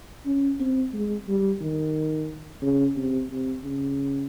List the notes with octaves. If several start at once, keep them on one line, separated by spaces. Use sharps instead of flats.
C#4
C4
G#3
G3
D#3
C#3
C3
C3
C#3